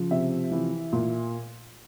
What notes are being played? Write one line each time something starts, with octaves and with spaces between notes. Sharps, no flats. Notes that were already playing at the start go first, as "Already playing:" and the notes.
Already playing: C#3 F3
C3 E5
E3
A#2